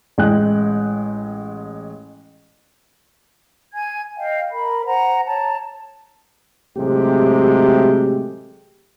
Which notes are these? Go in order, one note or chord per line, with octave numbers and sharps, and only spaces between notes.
A1 G#3 G5 F#6
G#5 G#6
D#5 F5 G5
A#4 B5
C5 F#5 A#5
C#5 A5 A#5
A1 C3 F#3 G#3 A3 G4